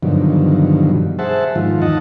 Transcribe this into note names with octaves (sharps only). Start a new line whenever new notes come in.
G2 B2 D3 D#3 F3 F#3
G#4 C5 E5 F#5 A5
G#2 D#3 F3 F4
E2 D#4 D#5 F#5 A5